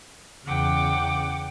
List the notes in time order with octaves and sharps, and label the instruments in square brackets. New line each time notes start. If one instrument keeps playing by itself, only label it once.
[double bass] E2 C#3 [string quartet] F#5 G5 D6